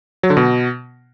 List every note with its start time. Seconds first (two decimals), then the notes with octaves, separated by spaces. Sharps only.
0.23 F#3
0.30 D3
0.37 B2